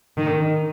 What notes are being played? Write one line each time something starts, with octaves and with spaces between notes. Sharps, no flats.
D#3